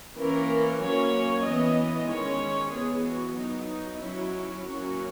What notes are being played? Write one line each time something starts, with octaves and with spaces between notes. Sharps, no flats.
E3 A#3 C#4 A#4
F#3 A#3 C#4 C#5
E3 B3 D#5
D#3 G#3 C#4 C#5
E3 B3 G#4
F#4
F#3 B3 D#4
D#4
F#3 C#4 E4
F#3 A#3 C#4 F#4